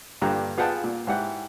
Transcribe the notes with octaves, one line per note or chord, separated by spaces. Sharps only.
G2 A#2 D3 G4 A#5 F#6
B3 F4 G#4 F#5 G5 A5
A#2
G#2 E4 G4 F#5